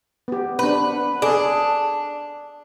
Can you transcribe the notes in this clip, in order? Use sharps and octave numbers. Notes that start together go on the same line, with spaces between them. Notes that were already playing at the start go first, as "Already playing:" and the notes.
B3 G4
C4 D4 B4
F#5
D4 G#4 A4